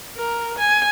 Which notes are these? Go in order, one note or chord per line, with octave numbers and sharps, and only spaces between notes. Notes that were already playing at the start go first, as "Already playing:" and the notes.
A#4
G#5